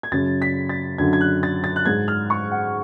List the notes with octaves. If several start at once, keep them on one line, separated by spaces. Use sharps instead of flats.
G#6
F#2 C#3 A6
B6
A6
F#2 D3 G#6
G#6
F#6
A6
A6
F#6
G#2 G#6
F6
C#6
F#5